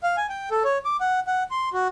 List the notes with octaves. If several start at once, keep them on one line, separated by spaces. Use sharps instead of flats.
F5
G#5
G5
A4
C#5
D6
F#5
F#5
C6
F#4